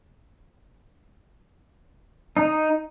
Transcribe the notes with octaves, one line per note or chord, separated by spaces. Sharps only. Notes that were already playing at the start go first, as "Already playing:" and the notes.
D#4